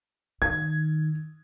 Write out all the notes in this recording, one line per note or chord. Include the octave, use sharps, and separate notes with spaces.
D#3 G#6